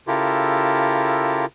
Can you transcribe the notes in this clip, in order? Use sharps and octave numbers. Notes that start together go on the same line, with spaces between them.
C#3 E4 F4 G4 A4 A#4